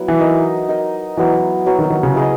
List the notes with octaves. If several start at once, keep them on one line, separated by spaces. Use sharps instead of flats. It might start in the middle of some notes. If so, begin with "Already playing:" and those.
Already playing: F#3 B3 E4
E3
D#4 A#4 D#5
D#4 A#4 D#5
E3 F#3 B3 E4
F#3 B3 E4
D#3
D#3
C#3
E4 G#4 D#5